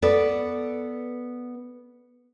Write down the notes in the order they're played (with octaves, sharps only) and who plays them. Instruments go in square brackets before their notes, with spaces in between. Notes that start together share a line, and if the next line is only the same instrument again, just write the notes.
[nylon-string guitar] B3 A4 B4 D5